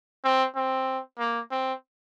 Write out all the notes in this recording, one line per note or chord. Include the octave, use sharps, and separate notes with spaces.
C4
C4
A#3
C4